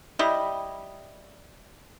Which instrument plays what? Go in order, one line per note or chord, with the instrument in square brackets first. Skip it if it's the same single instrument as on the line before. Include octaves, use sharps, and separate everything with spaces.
[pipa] G3 E4 G4 D#5